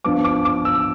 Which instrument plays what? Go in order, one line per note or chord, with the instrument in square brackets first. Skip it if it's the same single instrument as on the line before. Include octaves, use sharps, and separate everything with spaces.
[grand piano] G2 F3 B3 D4 D6
D6
D6
E6